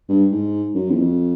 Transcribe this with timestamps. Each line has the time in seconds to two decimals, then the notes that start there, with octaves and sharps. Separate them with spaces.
0.09 G2
0.32 G#2
0.75 F#2
0.90 E2
0.97 F2